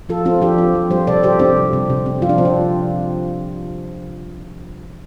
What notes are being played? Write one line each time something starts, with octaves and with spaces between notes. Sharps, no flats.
F3 F4 A4
C4 F4 A4
F3 D4 G4
C4
F3
G3 G4 C5
C3 A4 D5
C3 G4 C5
C4 D4 G4
G3
C3
C3
C4
F3 F4
D4
C3 C4
D4